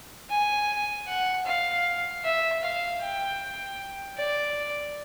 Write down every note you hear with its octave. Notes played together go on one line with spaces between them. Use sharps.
G#5
F#5
F5
E5
F5
G5
D5